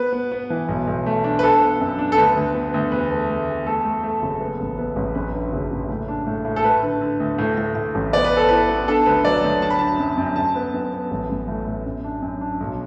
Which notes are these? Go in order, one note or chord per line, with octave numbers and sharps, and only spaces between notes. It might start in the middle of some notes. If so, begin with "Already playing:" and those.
Already playing: B3 B4
B3
B3
E3
B1
B1
A3
D4
B4
D4 A4
B3
F#2
D4
A4
D2 B4
D2
B3
D2
E2 B4
A3
A3
E2
A3 A4
A3
A3
F#1
B3
A1
B3
A1
F#2 B4
D3
F#1
F#1
A2
D4
A2
A2
A4
A3 B4
D3
D3
D2
A2
A2
A2
A1
B3 D5
B4
B3
A4
E4 B4
B3
D4 A4
D2 B4
F#3 D5
D2
D4 A5
B5
D4 A5
F#2
F#2
F#2 A5
B3
F#2
B3
A1
A1
A2
A2
F#2
D4
F#2
D4
B1